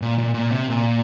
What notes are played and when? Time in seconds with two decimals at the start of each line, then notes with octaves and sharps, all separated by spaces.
0.02 A#2
0.18 A#2
0.34 A#2
0.51 C3
0.67 A#2